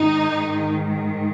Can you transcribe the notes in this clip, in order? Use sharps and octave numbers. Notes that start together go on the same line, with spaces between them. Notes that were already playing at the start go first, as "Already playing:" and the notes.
Already playing: G#2 D#3 D#4